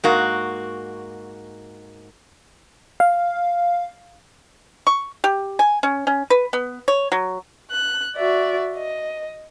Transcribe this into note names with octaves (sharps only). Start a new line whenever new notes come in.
G#2 A#3 F#4
F5
C#6
G4
G#5
C#4
C#4
B4
B3
C#5
F#3
F#6
F#4 D5 E5
D#5